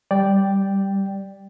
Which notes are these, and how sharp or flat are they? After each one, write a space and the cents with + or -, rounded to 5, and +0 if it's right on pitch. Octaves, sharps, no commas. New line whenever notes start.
G3 +0 D5 +0 G5 +0